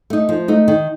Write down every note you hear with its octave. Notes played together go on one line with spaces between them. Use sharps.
A3 D#4
F3
A3 D#4
D#3